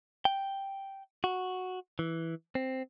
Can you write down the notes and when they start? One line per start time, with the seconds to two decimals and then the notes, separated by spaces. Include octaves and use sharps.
0.25 G5
1.24 F#4
1.99 E3
2.55 C4